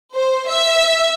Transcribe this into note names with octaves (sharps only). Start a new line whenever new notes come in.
C5
E5